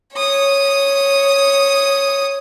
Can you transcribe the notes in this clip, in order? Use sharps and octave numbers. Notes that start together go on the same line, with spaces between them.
C#5 D#6